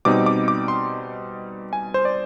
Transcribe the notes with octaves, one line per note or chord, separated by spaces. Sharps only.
B2 G3 C4 D#4 D6
D6
D6
C6
G#5
C5
D5